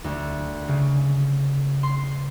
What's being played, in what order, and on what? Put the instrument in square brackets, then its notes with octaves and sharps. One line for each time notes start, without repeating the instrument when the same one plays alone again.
[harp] D2
C#3
C6